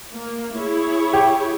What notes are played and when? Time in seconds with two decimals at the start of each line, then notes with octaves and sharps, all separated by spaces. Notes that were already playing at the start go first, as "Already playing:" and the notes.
0.13 A#3
0.56 E4 G#4 C#5
1.13 G4